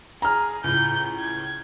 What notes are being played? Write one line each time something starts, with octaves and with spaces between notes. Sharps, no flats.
G#4 A#5 F6
C#2 A2 G6
G#6